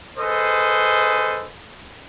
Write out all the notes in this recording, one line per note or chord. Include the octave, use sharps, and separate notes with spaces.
G#4 A4 B4 C5 D#5